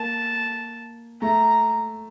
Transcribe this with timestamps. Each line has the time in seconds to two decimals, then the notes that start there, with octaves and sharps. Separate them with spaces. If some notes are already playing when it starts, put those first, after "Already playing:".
Already playing: A#3 A5
1.22 A3 A#5